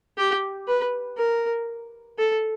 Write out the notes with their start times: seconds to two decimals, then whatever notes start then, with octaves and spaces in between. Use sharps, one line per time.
0.17 G4
0.68 B4
1.18 A#4
2.19 A4